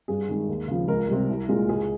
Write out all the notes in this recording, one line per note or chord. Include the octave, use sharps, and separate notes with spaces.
G2 G#4
D#3 G#3
D#2
C#3 F3
C#2 A#4
C3 G3
C2
A#2 G#3
C#2 G#4